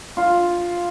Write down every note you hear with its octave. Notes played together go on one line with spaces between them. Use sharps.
F4